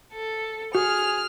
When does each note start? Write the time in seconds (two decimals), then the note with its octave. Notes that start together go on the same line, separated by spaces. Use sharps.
0.14 A4
0.75 F#4 G#4 F6